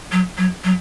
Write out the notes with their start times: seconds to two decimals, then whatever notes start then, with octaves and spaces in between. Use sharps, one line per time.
0.12 F#3
0.38 F#3
0.64 F#3